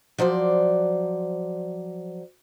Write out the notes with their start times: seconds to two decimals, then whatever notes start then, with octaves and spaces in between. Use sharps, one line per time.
0.18 F3 F#3 C5 D5